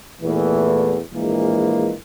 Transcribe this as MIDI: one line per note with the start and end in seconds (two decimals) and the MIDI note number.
0.21 0.99 40
0.21 0.99 46
0.21 0.99 52
0.21 0.99 57
1.13 1.94 34
1.13 1.94 52
1.13 1.94 56
1.13 1.94 58